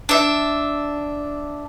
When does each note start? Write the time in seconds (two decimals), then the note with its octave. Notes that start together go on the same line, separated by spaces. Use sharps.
0.09 D4 E5